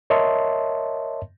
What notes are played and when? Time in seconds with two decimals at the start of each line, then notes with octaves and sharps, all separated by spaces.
0.10 A#4 C#5 D#5 E5 A5 C6